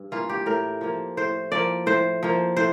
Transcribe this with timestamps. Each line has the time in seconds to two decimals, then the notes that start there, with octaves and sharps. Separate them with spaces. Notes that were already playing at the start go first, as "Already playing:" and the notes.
Already playing: G2
0.12 E3 A#3 F4
0.30 G4
0.46 A2 A#4
0.81 F3 A#3
1.17 A2 C5
1.52 F3 A#3 D5
1.86 A2 C5
2.23 F3 A#3
2.57 A2 C5